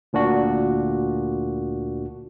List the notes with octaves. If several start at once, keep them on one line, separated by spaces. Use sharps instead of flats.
D2 A#2 D4 F#4